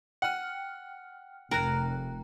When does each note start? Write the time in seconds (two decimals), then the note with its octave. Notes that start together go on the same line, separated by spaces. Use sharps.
0.22 F#5 G5 F6
1.51 F1 A#4 G5 A#5 F#6